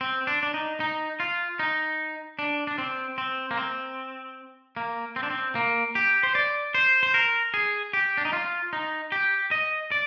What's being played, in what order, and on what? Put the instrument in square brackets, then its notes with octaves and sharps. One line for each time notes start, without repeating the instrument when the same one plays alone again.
[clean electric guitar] C4
D4
D4
D#4
D#4
F4
D#4
D4
D4
C4
C4
A#3
C4
A#3
C4
D4
C4
A#3
G4
C5
D5
C5
C5
A#4
G#4
G4
D4
D#4
F4
D#4
G4
D#5
D5